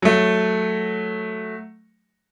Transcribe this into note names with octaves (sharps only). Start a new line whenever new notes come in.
F#3 A3